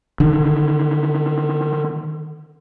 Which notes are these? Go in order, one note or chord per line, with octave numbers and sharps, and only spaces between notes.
D3 D#3